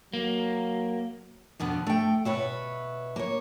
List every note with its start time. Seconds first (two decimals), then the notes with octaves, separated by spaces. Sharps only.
0.13 F#3 A#3
1.60 F2 B2 D3 B3
1.87 A3 G5
2.25 B2 B4 C#5 E5
3.16 A#3 C#5